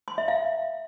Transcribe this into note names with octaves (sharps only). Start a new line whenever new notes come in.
C6
E5
F5